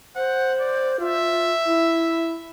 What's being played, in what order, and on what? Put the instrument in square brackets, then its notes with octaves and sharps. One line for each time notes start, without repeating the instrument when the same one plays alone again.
[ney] C5 [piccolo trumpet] F#5
[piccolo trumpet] D5
[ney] F4 [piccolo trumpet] E5
[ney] E4